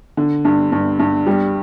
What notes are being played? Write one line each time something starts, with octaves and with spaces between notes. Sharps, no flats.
D3
G2
G2
G2
G3